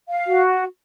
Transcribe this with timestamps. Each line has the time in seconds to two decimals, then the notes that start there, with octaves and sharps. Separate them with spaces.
0.09 F5
0.27 F#4